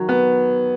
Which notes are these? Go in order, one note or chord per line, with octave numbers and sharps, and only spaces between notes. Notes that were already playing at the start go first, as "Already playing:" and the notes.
Already playing: D#3 F#3
B3